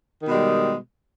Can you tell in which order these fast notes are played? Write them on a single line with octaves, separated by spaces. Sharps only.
D#3 B2 G#3 G3